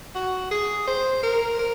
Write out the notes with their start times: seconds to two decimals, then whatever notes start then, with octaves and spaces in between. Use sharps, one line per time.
0.15 F#4
0.51 G#4
0.87 C5
1.23 A#4
1.59 A#4